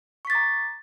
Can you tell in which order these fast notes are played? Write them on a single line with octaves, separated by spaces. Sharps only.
C#6 B6 A6 D6 A#5